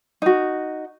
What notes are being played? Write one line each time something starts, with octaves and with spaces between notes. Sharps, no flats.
D#4 F#4